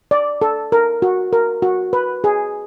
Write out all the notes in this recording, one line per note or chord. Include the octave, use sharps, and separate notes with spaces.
D5
A4
A#4
F#4
A#4
F#4
B4
G#4